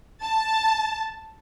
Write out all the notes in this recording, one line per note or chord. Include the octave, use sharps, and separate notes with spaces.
A5